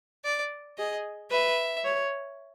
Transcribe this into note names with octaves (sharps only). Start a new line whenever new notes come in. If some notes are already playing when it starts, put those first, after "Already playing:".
D5
G#4 D#5
B4 E5
C#5